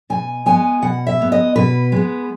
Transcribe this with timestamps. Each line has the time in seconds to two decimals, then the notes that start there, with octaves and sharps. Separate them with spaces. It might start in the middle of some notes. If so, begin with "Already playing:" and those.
0.10 B2 G#5
0.46 G#3 B3 G#5
0.82 B2 F#5
1.07 E5
1.19 G#3 B3
1.32 D#5
1.56 B2 B4
1.92 G#3 B3